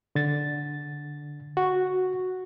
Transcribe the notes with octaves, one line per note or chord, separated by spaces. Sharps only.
D3 A6
F#4